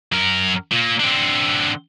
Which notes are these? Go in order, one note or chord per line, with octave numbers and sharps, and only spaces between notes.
F#2 A#4
A#2 A#3
D3 C4